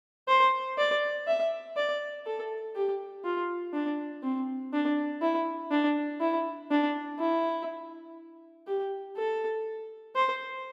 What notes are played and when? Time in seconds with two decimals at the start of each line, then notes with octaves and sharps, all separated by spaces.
0.28 C5
0.78 D5
1.27 E5
1.77 D5
2.26 A4
2.75 G4
3.24 F4
3.73 D4
4.23 C4
4.73 D4
5.22 E4
5.71 D4
6.20 E4
6.71 D4
7.19 E4
8.67 G4
9.17 A4
10.16 C5